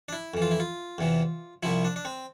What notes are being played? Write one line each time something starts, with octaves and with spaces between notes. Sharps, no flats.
D4
E4
F2 E3
F4
E4
F4
E2 C3 E3
C2 C3 F3 E4
D4
D4
C4